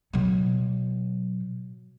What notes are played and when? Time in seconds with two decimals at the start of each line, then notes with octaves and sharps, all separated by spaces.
0.13 B2 F#3